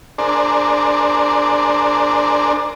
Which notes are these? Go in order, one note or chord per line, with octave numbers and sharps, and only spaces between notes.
D4 G#4 A#4 C5 D5